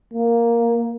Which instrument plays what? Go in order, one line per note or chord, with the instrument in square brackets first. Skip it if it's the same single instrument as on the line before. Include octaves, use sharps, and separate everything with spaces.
[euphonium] A#3